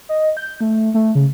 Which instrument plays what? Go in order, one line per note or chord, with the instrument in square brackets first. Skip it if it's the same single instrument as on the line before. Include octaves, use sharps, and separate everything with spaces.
[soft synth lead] D#5
G6
A3
A3
C#3